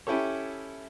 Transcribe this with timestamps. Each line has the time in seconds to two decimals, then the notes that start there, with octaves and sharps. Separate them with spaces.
0.07 C#4 E4 G4 A4 C#5